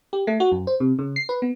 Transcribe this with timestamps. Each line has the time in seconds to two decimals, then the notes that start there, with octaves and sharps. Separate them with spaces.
0.13 G4
0.27 A3
0.40 F#4
0.52 F#2
0.67 C5
0.80 C3
0.99 C#3
1.16 C7
1.29 B4
1.42 B3